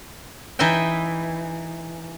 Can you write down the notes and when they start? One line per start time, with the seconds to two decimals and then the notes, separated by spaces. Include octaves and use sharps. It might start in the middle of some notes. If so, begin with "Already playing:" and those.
0.59 E3 D#4 D#5 E5 G5